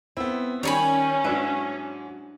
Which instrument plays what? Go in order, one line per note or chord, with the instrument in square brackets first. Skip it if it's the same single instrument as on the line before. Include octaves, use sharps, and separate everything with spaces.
[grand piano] B3 C4 [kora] E4
[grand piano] D#3 [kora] G3 [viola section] C#4 [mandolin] C#5 G#5 B5
[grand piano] G#2 F#3 [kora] D4 E4 B4